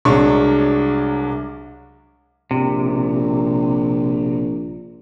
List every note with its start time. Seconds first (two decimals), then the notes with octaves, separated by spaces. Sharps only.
0.05 C2 F#3 G#3 D4 C#5 C#6
2.51 A#1 C3